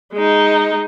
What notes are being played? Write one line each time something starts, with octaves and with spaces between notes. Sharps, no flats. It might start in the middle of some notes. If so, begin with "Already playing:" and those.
G#3 D#4